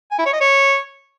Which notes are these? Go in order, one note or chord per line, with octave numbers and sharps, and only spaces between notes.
G#5
E4
C#5
D#5
C#5